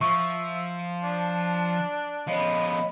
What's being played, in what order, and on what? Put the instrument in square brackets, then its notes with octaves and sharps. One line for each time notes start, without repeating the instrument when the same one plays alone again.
[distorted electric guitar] F3 [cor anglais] E5 [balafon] C#6
[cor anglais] D4
[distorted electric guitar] F3 B3 [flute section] C#5 D#5 B5